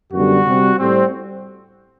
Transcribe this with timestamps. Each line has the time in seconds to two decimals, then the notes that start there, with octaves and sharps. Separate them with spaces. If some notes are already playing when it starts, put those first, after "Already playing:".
0.12 F#2 D3 G3 B3 F#4
0.45 C3 G3 C4
0.78 A2 G3 C4